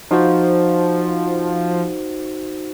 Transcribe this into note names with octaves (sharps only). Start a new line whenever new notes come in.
F3 D#4 F#4 C5